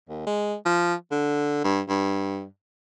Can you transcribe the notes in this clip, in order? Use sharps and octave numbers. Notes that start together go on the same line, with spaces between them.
D#2
G#3
F3
D3
G2
G2